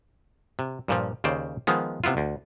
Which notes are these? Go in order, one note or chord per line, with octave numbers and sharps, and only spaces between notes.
C3
G2 A#2 F3
D#2 C#3 C5 D5
D#3 F3 G#3 B3
C3 B3 E4 F4
D2